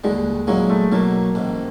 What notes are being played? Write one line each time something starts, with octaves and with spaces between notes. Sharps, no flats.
D#2 D3 G3 G#3
A#2 F#3 G#3 A#3 C#4 E4
A3
B2 F#3 A3 A#3
A1 G#2 D#3